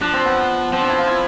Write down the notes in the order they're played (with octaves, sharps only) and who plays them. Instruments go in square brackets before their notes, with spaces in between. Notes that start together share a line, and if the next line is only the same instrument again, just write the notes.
[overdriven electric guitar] F3 [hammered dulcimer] D4
[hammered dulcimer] C4
B3
[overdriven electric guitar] F3 [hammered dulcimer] C4
[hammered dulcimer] D4
E4
F4
E4